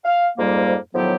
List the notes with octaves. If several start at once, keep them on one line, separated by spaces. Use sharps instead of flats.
F5
F2 G#2 F3 G3 A#3
A2 D#3 F3 F#3 B3 G4